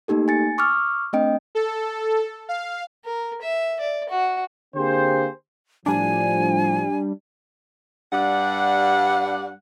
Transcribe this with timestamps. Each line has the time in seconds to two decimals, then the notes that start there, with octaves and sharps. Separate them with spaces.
0.08 A3 A#3 D#4 G4 A4
0.28 G#5 A6 C#7
0.58 C#6 D6 E6 F6
1.13 A3 C4 D4 D#5 G5 D7
1.55 A4
2.49 F5
3.05 A#4
3.42 E5
3.80 D5
4.09 F#4
4.75 D3 A#3 C4 G4 G#4 C5
5.86 A2 F3 G3 D4 G#5
8.13 G2 G3 D4 F#5